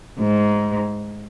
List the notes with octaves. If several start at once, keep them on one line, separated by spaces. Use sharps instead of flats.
G#2